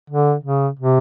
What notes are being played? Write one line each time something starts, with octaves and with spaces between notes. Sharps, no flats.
D3
C#3
C3